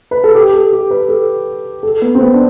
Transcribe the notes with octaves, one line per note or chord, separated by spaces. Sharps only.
B4
A4
G4
A4
G4
B4
A4
A4
B3
C4
B3
D4